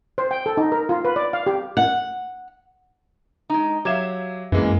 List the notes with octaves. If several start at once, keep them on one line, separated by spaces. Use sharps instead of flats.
C5
G5
A4
D#4
A#4
F4
B4
D5
F5
G4
F#5
G#3 D#4
F#3 G4 E5 F5 G#6 E7
F#2 E3 G#3 A#3